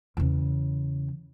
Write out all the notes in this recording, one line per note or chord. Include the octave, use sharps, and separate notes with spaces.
E2 C#3